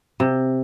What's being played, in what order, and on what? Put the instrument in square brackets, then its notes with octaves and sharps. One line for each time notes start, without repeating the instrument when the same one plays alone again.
[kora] C3